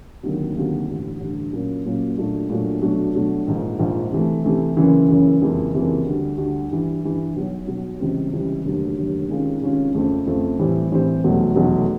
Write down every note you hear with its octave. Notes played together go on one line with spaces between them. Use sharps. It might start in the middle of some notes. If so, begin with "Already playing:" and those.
D2 C3 D#3 F#3 A#3
D2 C3 D#3 F#3 A#3
A1 G2 D3
A1 G2 D3
A#2 F#3 A#3 C#4
A#2 F#3 A#3 C#4
A#2 F#3 A3 D4 F#4
A#2 F#3 A3 D4 F#4
B2 F#3 A3 D4 F#4
B2 F#3 A3 D4 F#4
A#1 G#2 F3
A#1 G#2 F3
C3 E3 A3
C3 E3 A3
F#1 F#2 C#3 E3
F#1 F#2 C#3 E3
F#1 F2 C3 E3 G#3
F#1 F2 C3 E3 G#3
D2 D3 G3
D2 D3 G3
G2 E3 G3
G2 E3 G3
B1 B2 F#3
B1 B2 F#3
C#2 C3 E3 G3 C4
C#2 C3 E3 G3 C4
F1 D#2 D3 F#3
F1 D#2 D3 F#3
C3 D#3 G#3 C#4 F4
C3 D#3 G#3 C#4 F4
F2 C#3 F3 A3 C4
F2 C#3 F3 A3 C4
A2 E3 G3 C4
A2 E3 G3 C4
F1 E2 B2 F#3 A3
F1 E2 B2 F#3 A3